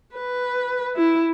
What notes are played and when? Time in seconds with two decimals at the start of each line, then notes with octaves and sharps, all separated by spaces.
0.16 B4
0.97 E4